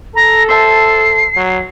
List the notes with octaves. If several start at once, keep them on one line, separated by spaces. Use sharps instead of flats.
A4 A#5
C5 E5 A5 C7
F#3